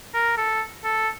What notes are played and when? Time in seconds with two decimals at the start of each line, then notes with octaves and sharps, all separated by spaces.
0.14 A#4
0.37 A4
0.84 A4